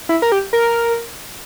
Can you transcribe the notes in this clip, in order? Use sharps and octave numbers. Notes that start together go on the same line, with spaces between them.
E4
A#4
G4
A#4